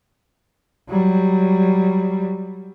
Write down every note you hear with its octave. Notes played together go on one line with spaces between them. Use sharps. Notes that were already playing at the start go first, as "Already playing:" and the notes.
F#3 G3